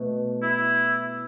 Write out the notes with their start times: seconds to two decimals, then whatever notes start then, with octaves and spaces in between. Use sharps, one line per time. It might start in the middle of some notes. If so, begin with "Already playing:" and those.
Already playing: B2 A3
0.42 E4